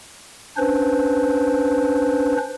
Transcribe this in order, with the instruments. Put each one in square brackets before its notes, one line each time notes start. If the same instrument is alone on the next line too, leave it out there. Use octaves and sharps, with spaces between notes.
[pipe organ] C#4 D4 B4 C5